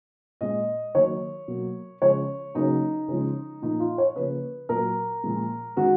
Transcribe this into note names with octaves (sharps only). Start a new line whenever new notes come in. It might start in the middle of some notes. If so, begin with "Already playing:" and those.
A#2 G#3 D#5
D#3 F#3 A#3 C#5
B2 F#3 A#3
C#3 F3 G#3 C#5
C#3 F#3 A#3 D#4
C#3 F3 G#3
A#2 F3 A#3 D#4
F4
C#5
C#3 F3 A#3 B4
A#2 F#3 A#3 A#4
A#2 F3 G#3
D#3 G#3 F#4